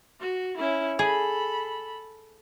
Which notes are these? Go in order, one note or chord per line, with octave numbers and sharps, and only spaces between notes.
F#4
C#4 E4
G#4 A4 B5